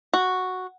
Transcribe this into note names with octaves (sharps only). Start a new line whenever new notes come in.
F#4